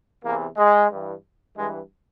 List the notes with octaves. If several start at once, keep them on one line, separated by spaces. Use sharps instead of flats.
E2 C3 E3 A#3
G#3
G2 E3
G2 E3 G#3